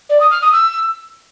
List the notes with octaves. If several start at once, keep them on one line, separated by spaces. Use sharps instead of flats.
D5
D#6
F6
D#6
E6